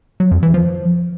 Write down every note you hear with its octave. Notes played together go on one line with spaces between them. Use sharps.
F#3
F2
E3
F3